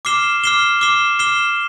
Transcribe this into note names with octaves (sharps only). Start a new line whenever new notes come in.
D6 F6 C7 E7 G7
D6 F6 C7 E7 G7
D6 F6 C7 E7 G7
D6 F6 C7 E7 G7